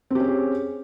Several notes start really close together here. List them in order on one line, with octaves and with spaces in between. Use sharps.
C4 G4 C#4 G#4